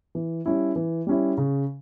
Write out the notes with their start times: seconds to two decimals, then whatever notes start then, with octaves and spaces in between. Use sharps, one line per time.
0.15 E3
0.46 G3 C#4 E4
0.76 E3
1.07 G3 C#4 E4
1.37 C#3